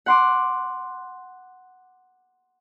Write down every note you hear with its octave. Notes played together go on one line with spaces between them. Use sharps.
F#5 C6 D6